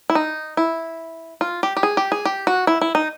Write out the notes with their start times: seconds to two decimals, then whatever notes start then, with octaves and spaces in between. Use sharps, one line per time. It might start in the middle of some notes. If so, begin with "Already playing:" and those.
0.10 E4
0.15 D#4
0.57 E4
1.41 F4
1.63 G4
1.77 G4
1.83 G#4
1.97 G4
2.12 G#4
2.25 G4
2.47 F#4
2.67 E4
2.81 E4
2.95 D#4